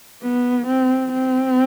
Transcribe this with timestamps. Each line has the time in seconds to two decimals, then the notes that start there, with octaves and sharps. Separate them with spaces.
0.22 B3
0.66 C4
1.12 C4